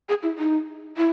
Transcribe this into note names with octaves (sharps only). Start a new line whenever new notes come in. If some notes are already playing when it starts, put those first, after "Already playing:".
G#4
E4
D#4
E4